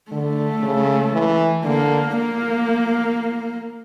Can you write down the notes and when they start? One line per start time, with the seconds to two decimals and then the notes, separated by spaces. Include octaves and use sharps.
0.11 D3 A3
0.63 C#3
1.13 E3
1.64 D3 A#3
2.16 A#3